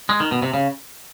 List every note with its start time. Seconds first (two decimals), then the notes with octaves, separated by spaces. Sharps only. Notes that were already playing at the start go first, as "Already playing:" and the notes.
0.09 G#3
0.20 D#3
0.31 B2
0.42 C3
0.54 C#3